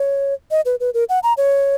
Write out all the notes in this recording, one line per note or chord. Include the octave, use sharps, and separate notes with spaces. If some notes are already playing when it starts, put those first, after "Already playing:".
Already playing: C#5
D#5
B4
B4
A#4
F#5
A#5
C#5